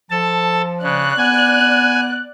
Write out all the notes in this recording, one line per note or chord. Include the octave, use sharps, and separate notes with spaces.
F3 A4 A5
C#3 D5 F#6
B3 G#5